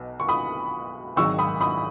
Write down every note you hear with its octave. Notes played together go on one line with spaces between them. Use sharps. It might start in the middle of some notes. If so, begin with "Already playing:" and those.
Already playing: B1 B2
C#6
B5 D#6
G#1 G#2 D#3 F#3 C#6 E6
B5 D#6
B5 D#6